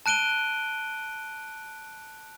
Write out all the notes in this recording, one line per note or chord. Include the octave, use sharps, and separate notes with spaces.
A5 F#6 D7 D#7 G7